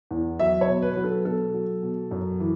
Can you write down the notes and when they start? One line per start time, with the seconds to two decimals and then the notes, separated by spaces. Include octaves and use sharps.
0.11 E2
0.40 F#3 E5
0.61 C#5
0.68 B2
0.82 B4
0.93 F#3 B4
1.04 A4
1.25 B2 A4
1.54 F#3
1.83 B2
2.11 F#2
2.40 E3